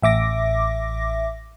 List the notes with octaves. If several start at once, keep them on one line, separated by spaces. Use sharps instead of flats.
A1 E5 D6 A#6